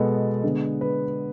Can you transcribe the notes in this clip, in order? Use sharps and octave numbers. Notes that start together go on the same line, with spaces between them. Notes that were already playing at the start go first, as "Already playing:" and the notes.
Already playing: B2 G#3 B3 A4
D3 G#3 B3
B4